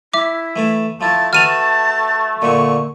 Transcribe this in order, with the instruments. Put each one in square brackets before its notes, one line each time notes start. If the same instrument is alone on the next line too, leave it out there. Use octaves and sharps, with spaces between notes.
[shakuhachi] E4 [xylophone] E5 D6
[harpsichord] E3 A3 A5
[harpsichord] F3 E4 [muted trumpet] A3 [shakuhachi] A5
[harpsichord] F#4 B4 E5 [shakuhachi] A5 [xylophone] F6 D#7 F7
[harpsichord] A#2 D3 [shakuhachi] C#6